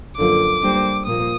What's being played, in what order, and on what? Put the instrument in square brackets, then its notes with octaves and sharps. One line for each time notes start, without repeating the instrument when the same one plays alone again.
[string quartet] F#2 D3 F3 A#3 [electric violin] D6
[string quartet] G3 A#3 D4 G4 C5
[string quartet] A#2 F3 A#3 [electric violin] D#6